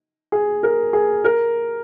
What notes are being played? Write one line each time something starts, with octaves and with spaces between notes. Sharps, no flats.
G#4
A#4
G#4
A#4